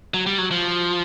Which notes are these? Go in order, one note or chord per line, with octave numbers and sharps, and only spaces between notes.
F#3
G3
F#3
F3